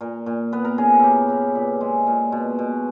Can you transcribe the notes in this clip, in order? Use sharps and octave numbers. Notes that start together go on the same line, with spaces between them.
A#2 A#4
A#2
B3 B4
A#4
C#3 G#4
C#3 E4 G4
C#3 E4
A#2 B4
G#3
A#2
B2
B2